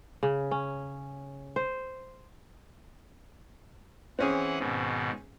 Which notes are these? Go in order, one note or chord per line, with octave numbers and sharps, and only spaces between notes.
C#3
C#4
C5
E3 C4 C#4 G#4 F#5
G#2 B2 D#3